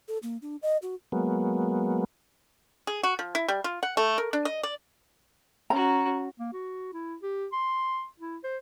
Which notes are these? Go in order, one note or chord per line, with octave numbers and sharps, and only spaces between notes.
A4
A#3
D4
D#5
F#4
F#3 G#3 A#3 B3
G#4
F#4
F3
E4
G3
F4
F#5
A3
A#4
D4
D#5
D5
C#4 F#4 A#5
A#3
F#4
E4
G4
C6
E4
C5